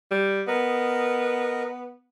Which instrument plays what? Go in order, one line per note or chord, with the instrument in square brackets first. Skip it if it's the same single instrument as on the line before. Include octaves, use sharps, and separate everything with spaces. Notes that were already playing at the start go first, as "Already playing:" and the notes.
[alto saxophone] G3
[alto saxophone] B3 [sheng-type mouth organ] A#4 D#5